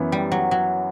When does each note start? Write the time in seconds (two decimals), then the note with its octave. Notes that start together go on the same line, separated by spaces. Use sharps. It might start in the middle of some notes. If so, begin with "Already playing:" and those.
Already playing: F#2 E3 B3
0.12 G3
0.32 F#3
0.51 F#3